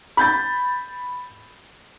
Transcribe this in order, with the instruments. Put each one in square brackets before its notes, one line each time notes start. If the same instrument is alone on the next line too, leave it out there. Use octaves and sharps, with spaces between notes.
[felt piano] B5 G6 A6